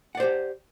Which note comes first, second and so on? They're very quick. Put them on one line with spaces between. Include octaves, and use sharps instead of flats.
F#5 D5 C5 G4